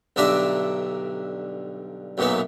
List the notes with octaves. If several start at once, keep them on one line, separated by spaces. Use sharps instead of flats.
B1 G2 D3 D4 E5 A#5
B1 F#2 A#2 E3 B3